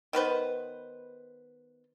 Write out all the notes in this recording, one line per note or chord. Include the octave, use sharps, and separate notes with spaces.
D#3 B3 B4 C5